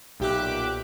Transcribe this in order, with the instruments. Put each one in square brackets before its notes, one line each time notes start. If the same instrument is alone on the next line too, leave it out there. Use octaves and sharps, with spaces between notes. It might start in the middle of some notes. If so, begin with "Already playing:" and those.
[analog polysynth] B1 A#2 G4 E5 D6 F#6